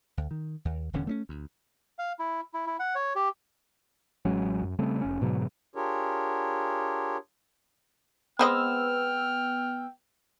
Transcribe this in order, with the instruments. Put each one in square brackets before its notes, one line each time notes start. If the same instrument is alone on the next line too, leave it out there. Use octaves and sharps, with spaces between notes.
[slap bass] D2
D#3
D#2
D1 E2 D3 C#4
A3 C4 C#4
D2
[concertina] F5
E4
E4
E4
F#5
C#5
G4
[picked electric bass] A1 F#3 G#3 C#4
F#2
C#3 G3 A3 C4
F1 C#4
G#2 B2 D3 F#3
[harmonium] D4 F4 G4 G#4 A#4 C#5
[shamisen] G#3 C4 D#5 [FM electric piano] B3 E6 [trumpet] G5 [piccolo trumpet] F6